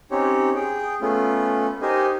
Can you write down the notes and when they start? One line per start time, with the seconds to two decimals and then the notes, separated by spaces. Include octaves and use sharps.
0.11 C4 C#4 D#4 G4 C#5
0.55 G#4 G5
1.01 A3 B3 C#4 F4
1.82 D#4 G4 A#4 C5 D#5 G#5